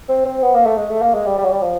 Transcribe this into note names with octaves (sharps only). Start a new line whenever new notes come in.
C4
C4
B3
A#3
A3
G#3
A3
A#3
G#3
G3
G3
F#3
G3
F3